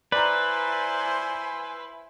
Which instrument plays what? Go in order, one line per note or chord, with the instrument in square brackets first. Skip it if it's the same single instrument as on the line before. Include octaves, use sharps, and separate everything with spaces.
[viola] E4 C5 [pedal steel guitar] B4 [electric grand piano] D5 A#5 [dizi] G#5